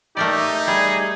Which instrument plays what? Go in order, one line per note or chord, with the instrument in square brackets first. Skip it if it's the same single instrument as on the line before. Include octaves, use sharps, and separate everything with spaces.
[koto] A3 A#4 D5 [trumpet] D#4 [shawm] G4
[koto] G3 [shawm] G#4